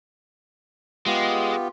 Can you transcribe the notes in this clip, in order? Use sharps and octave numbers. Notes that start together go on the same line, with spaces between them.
G#3 B3 F4 G4